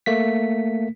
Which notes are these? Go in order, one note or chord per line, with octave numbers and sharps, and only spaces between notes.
A3 A#3 B6